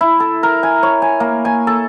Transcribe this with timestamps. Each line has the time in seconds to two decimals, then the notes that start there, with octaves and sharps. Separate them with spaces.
0.01 E4
0.20 A4
0.43 A#4
0.63 G#5
0.83 C#5
1.02 G#5
1.20 A#3
1.45 G#5
1.67 A4